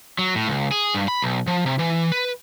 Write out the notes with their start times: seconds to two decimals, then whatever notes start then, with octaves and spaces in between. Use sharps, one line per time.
0.19 F#3
0.35 A2
0.48 C#2
0.71 G#4
0.95 G2
1.08 B5
1.22 B1
1.47 F3
1.66 C3
1.79 E3
2.12 B4